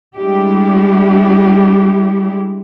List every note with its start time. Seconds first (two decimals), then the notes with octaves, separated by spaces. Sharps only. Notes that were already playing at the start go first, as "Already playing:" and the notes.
0.17 G3 G#3 D4 E4 G4